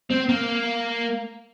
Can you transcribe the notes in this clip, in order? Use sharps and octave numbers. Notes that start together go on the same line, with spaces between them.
C4
A#3